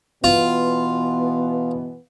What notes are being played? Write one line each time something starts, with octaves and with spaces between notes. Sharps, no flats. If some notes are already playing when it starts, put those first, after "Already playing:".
B2 E3 B3 F4